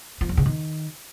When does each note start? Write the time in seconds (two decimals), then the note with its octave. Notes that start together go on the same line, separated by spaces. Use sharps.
0.21 F3
0.29 E2
0.37 C#3
0.46 D#3